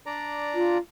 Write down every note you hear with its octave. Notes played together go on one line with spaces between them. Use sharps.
D4 D5 A#5
F4